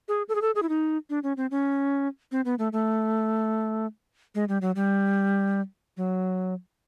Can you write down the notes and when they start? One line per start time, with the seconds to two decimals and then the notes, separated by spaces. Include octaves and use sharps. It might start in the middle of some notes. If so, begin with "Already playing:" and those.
0.08 G#4
0.29 A4
0.35 G#4
0.42 A4
0.55 G#4
0.63 E4
0.69 D#4
1.10 D4
1.23 C#4
1.37 C4
1.51 C#4
2.32 C4
2.45 B3
2.59 A3
2.73 A3
4.35 G#3
4.49 G3
4.62 F#3
4.76 G3
5.97 F#3